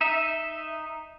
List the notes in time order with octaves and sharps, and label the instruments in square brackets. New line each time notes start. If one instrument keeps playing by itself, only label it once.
[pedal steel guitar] D#4 E5